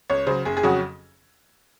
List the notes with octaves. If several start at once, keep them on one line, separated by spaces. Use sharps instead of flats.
C#2 C#5
C#3 F#3 C5
F#1 G#4
G#4
F2 C#3 F#3 F#4